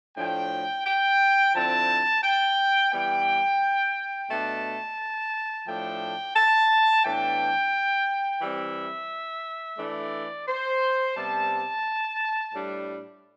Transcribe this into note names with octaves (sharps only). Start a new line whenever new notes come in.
A2 F3 A3 D4 G5
G5
D3 F3 C4 E4 A5
G5
E3 G3 B3 G5
B2 A3 D4 A5
A2 F3 A3 D4 G5
A5
A2 E3 B3 D4 G5
E3 G3 C4 E5
E3 A3 D4 D5
C5
C3 G3 B3 A5
A2 G3 D4